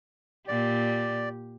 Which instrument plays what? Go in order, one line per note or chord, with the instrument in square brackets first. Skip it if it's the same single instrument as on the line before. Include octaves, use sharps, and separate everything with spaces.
[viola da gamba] A#2 G4 [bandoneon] D5